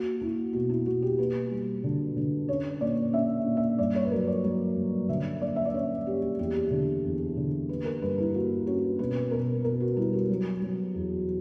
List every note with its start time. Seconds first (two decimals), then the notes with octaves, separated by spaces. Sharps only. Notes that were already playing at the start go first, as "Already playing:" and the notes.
Already playing: A#3 F#4
0.21 A#3 E4
0.53 B2 F#4
0.70 E4
0.86 B2 F#4
1.02 G4
1.19 A#3 B4
1.51 G3
1.84 D3
2.16 D3
2.49 C#4 C#5
2.81 A#2 D5
3.13 C#4 E5
3.46 A#2
3.57 E5
3.79 G2 D5
3.95 C#5
4.05 B4
4.11 F#3 A#4
4.27 D5
4.44 F#3
4.76 G2
5.09 D3 E5
5.41 A#3 D5
5.56 E5
5.65 D5
5.74 C#4 C#5
6.07 A#3 G4
6.22 G4
6.39 E2 G4
6.71 D3
7.04 E2
7.37 D3
7.69 A#3 B4
7.85 A#4
8.02 G2 B4
8.18 E4
8.34 A#3 F#4
8.66 C#4 F#4
8.99 B2 B4
9.31 B2 A#4
9.64 B2 A#4
9.80 F#4
9.96 G3 E4
10.13 F#4
10.29 F#3
10.62 F#3
10.95 E2